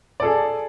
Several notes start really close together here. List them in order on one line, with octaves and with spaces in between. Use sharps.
D5 A4 G#4